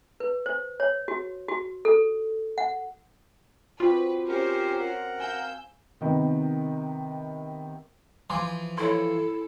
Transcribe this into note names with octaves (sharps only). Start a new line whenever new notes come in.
B4
C5
C#5
F#4
F#4
A4
F#5
C4 F4 F#4 B4 D5
C#4 G4 A#4 C5
A#4 F#5
F5 G#5 E6 G6
C3 D#3 B3
E3 F3 G#5 C6 D6
E4 A4 C#5 C6